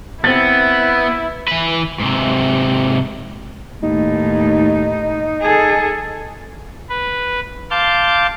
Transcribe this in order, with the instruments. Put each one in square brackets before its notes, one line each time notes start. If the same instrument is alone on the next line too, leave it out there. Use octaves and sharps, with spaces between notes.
[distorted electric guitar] B3 [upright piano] C4 A6 [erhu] E4
[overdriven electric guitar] E3 B4
G#2 C3
[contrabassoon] D#2 [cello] A2 [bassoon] D#4
[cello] G#4 A4
[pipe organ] B4
F5 A5 C6 D6 G6